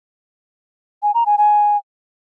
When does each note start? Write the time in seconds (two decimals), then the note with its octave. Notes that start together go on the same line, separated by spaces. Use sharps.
1.03 G#5
1.14 A#5
1.26 G#5
1.38 G#5